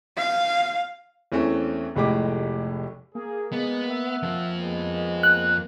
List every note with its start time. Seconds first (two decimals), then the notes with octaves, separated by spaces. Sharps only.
0.17 F5
1.32 E2 E3 A3 C4 C#4
1.96 F1 A2 G#3 G4 D6
3.15 A#3 G#4
3.53 G#3 B3
3.90 E5 F#5
4.23 F2 F3
4.59 G#3 B3
5.23 F#6